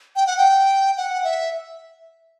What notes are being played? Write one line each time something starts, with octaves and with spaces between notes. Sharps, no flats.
G5
F#5
G5
F#5
E5